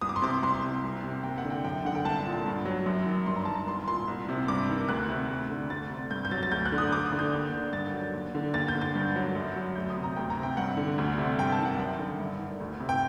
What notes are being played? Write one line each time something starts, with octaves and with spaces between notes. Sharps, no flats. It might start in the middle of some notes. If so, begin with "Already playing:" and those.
C2 D#6
D6
C6
C3 D6
C2 C6
C3
C2
C3
D#2 G5
F#5
D3
G5
F#2 G5
D3 F#5
G5
C2 A5
A#2
G2
F#3
F#2
D#3
G2 C6
A#5
D#3 A5
A#5
C2 C6
A#2 C6
C2
C3
G2 D6
D#3
D2 F#6
C3
D2
D3
D2 A6
C3
G2 G6
G6
F#3 A6
A6
D2 G6
F#6
D3
D#6
D2 D6
D#6
D3
G6
D#2
D3
G2 A6
F#3
D#2
D3
D#2 A6
G6
D3
A6
G2
F#3
F#2
F#3
D2 G6
D#6
C3
A#5
D2 G5
A#5
C3
G5
G2 F#5
D3
D2
C3
G2 G5
A5
D#3
F#5
F#2 G5
D3
G2
D#3
D2
C3
G5